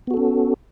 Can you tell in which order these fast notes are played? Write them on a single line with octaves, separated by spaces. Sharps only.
B3 F#4 A4 C#4